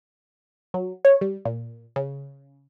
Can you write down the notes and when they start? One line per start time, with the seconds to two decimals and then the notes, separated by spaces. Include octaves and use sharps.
0.74 F#3
1.05 C#5
1.21 G3
1.45 A#2
1.96 C#3